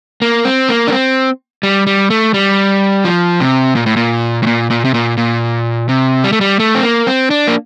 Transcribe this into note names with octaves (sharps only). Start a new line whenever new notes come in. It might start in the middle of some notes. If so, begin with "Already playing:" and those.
A#3
C4
A#3
D4
C4
G3
G3
A3
G3
F3
C3
A#2
A2
A#2
A2
A#2
A#2
C3
A#2
A#2
C3
G3
A3
G3
A3
C4
A#3
C4
D4
A#3